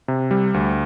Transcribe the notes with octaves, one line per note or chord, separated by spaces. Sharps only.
C3
G3
D2